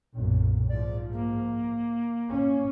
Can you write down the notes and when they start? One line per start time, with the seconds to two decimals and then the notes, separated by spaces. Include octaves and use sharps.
0.15 B1 F#2 A#2
0.68 G#2 F3 D5
1.12 A#3
2.29 C#4